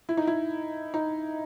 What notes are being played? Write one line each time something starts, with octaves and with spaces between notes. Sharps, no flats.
E4
D#4
E4
D#4